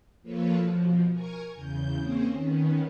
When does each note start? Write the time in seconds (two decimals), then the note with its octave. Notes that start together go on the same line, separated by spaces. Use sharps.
0.22 F3 A#3 F4 A4 B4 C#5
0.56 B2 F3
1.12 A#4 G#5 A#5 C#6 G#6
1.54 E2 C#3 G6
1.99 A#3 C4 C#4 G#4 C5 C#5
2.32 D#3 B3 C#4